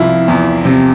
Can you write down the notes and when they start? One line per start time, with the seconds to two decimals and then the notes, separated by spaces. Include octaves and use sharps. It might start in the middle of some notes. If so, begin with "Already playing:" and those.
Already playing: C2 C3 F3 E4 F4
0.28 E2
0.65 C3